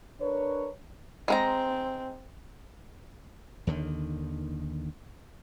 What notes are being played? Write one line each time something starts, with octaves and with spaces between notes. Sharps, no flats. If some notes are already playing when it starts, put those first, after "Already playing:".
D4 A#4 B4 C#5
G#3 C4 A#4 A#5
D#2 D3 D#3